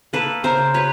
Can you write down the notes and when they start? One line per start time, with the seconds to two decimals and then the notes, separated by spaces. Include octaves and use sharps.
0.13 A#3 A4 B4
0.44 C#3 A#4 C5
0.74 F#3 B4 C#5